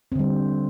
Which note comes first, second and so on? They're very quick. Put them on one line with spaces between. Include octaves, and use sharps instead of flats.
C4 D3 G3